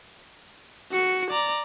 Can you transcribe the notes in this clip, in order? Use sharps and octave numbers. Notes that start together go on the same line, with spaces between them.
F#4 C#7
D5 A#5